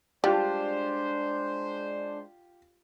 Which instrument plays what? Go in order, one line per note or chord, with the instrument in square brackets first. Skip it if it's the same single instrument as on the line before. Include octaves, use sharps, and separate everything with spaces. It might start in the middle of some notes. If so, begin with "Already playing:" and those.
[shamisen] G3 [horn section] G#3 C5 [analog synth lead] D4 [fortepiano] F4 G4